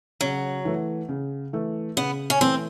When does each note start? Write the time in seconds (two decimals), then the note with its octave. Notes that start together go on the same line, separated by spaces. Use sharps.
0.21 C#3 F#3
0.65 E3 A3
1.09 C#3
1.53 E3 A3
1.97 C#3 B3
2.30 C#4
2.41 E3 A3 C4